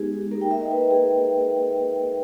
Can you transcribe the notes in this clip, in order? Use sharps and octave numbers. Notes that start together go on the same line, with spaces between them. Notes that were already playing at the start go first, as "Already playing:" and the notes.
Already playing: G#3 B3 D#4 G4 G#4
A#3 D#4 A#4
G5
E5
D#5
B4
G#4